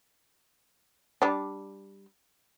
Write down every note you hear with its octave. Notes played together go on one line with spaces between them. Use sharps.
G3 D4